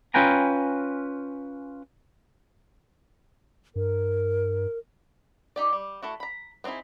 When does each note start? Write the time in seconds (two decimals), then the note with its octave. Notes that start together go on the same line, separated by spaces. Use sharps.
0.14 C#4 F4 B4 G5 G#5 A#5
3.76 G2 A#4
5.56 D#4 G4 D5
5.73 G3
6.03 A3 E4 F#4
6.20 A#5 B5
6.64 B3 C4 D#4 E4 G#4